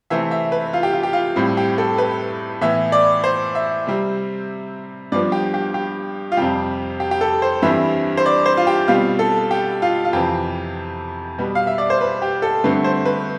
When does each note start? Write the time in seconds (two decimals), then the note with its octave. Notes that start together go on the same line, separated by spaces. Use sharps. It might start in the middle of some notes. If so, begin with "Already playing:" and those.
0.10 C3 E3 A3 C4 E5
0.31 E5
0.52 B4
0.73 F4
0.83 G4
0.93 F4
1.03 G4
1.13 F4
1.36 A2 G3 C4
1.57 G4
1.78 A4
1.98 B4
2.61 A2 E3 B3 E5
2.92 D5
3.24 C5
3.55 E5
3.87 C3 G3 C4
5.12 G2 F3 B3 D5
5.32 G4
5.54 G4
5.74 G4
6.32 F4
6.37 F2 C3 G3 G4
7.00 G4
7.11 G4
7.21 A4
7.42 C5
7.62 G2 E3 G3 C4 E5
8.17 C5
8.26 D5
8.46 C5
8.57 F4
8.67 G4
8.88 B2 G3 C4 F4
9.19 A4
9.51 G4
9.82 F4
10.05 F4
10.13 F2 C3 E3 G4
11.38 B2 G3 B3
11.55 F5
11.67 E5
11.78 D5
11.90 C5
12.01 B4
12.22 G4
12.42 A4
12.64 G2 D3 A3 C4 B4
12.84 C5
13.05 B4